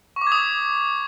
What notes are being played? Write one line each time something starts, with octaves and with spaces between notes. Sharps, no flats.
C#6
D6
G#6
D#6